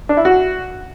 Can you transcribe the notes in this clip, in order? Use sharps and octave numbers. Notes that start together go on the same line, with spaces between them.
D4
E4
F#4